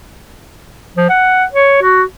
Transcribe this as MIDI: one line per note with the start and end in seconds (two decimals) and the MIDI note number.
0.97 1.08 53
1.09 1.45 78
1.53 1.80 73
1.82 2.02 66